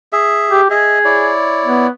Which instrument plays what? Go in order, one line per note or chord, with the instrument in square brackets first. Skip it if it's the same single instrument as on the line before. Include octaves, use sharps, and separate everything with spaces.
[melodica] G#4 E5
[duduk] G4
[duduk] G#4 [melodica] D#5 E5
[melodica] E4 C#5 D5
[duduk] B3